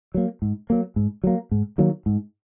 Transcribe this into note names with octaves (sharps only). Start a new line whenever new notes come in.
F#3 A#3
G#2
F#3 A#3
G#2
F#3 A#3
G#2
D#3 F#3 A#3
G#2